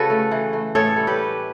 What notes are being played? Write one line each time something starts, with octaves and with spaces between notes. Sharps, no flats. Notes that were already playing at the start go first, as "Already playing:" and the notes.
Already playing: C#3 C#4 F#4 A4 B4
A3
E3
A3
A2 A4 C#5
G3
G4 B4
C#4